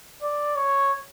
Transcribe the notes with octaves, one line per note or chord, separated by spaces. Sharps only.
D5
C#5